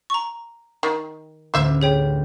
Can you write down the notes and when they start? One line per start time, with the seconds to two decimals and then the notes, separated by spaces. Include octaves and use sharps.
0.10 A#5 C#6
0.83 D#3
1.54 A1 D2 C5 E5 F6
1.81 G4 G#4 C#5 G5